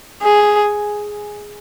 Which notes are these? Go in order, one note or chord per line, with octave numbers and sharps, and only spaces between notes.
G#4